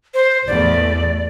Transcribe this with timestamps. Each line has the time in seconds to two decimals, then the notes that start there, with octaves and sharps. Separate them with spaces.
0.14 C5
0.47 A1 E2 A3 D5